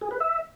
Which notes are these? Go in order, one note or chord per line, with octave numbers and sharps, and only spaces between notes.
G#4
B4
E5